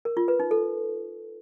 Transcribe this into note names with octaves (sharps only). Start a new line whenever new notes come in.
A#4
F4
B4
D#4
A4